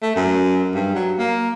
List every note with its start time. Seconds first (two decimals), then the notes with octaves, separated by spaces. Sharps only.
0.03 A3
0.16 F#2
0.74 G2
0.95 F#3
1.19 A#3